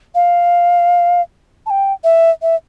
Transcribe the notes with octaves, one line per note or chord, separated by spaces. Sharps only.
F5
A5
G5
E5
E5